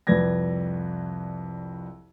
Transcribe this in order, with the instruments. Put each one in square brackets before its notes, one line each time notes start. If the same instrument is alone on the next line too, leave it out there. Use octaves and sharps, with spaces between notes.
[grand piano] C2 F2 B4 D5 G#6 A#6